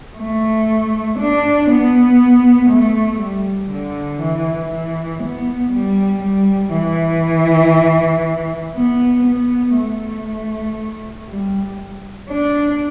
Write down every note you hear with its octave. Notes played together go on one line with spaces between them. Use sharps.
A3
D4
B3
A3
G3
D3
E3
E3
B3
G3
G3
E3
B3
B3
A3
G3
D4